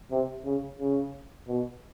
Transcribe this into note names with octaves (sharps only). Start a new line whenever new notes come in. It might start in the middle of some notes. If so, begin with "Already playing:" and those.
C3
C#3
C#3
B2